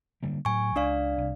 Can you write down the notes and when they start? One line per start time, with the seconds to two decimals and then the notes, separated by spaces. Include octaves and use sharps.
0.23 D3 G3 A#3
0.45 A2 F#3 G#5 C#6
0.76 C#2 D4 D5 F5
1.18 C2 C3